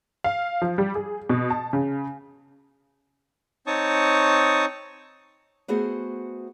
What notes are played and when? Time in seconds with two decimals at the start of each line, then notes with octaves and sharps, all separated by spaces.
0.24 F5
0.62 F3
0.78 G3
0.95 G#4
1.30 B2
1.50 A5
1.73 C#3
3.67 C4 D#4 C#5 A5 C#6 D#6
5.68 A3 B3 F#4 G#4 C5 F#5